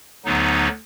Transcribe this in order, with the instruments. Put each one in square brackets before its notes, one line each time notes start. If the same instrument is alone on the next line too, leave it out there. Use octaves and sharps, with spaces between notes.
[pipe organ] D2 D3 F#3 B3 D#4